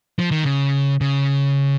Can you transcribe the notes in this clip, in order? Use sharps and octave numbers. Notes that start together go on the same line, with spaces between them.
F3
D#3
C#3
C#3